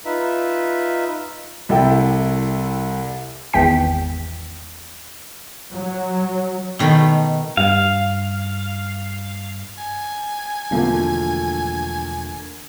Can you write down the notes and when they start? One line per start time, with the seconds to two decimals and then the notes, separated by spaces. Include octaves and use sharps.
0.05 D#4 F4 B4 E5
1.69 C2 E4 A4 G5
3.53 G#1 E2 G5 B6
5.73 F#3
6.79 B2 D#3 A3 B5
7.57 G2 F5
9.78 G#5
10.71 E1 D3 F3 A3 A#3